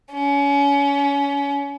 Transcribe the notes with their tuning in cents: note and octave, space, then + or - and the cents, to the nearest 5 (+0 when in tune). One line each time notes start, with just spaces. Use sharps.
C#4 +30